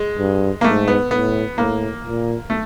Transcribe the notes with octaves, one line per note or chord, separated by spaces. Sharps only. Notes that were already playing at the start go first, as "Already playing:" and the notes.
Already playing: G#3
G2
A#3
G#2 A3
B3
A2 B3
A2 A#3
A#2
A3